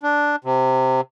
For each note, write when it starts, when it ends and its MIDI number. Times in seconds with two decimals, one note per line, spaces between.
0.03 0.36 62
0.45 1.01 48